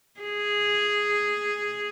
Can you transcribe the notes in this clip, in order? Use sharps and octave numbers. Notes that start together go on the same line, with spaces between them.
G#4